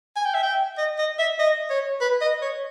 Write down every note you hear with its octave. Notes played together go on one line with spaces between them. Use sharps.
G#5
G5
E5
G5
D#5
D#5
E5
D#5
C#5
B4
D#5
C#5